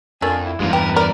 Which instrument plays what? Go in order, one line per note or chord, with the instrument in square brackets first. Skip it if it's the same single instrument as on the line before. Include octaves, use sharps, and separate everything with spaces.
[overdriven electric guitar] F2 [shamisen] A3 A#3 D4 [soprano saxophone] G#5
[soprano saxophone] E4
[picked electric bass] E2 G2 [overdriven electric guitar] G#3 D#4 [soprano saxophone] F4
[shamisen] G4 [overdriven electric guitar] A#4 [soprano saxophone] B4
[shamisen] A#4 [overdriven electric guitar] D5